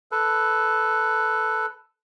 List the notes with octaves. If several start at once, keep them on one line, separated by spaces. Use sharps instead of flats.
A4 B4